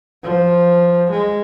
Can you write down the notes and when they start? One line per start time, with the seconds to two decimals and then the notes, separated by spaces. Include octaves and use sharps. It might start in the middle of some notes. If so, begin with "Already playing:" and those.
0.23 F3
1.11 G#3